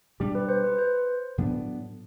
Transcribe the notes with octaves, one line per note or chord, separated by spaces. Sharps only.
B2 G3 D4 G4
B4
C5
B4
C5
A2 F#3 B3 D4